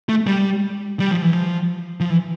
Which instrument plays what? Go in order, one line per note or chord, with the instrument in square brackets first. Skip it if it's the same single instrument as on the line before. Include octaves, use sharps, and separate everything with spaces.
[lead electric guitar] A3
G3
G3
F3
E3
F3
F3
E3